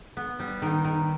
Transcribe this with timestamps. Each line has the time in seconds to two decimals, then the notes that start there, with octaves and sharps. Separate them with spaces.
0.17 B3
0.39 G3
0.62 D#3
0.85 D#3